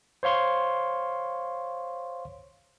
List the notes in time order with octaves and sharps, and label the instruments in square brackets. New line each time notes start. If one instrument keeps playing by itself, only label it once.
[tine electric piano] C5 C#5 F5 C6 C#6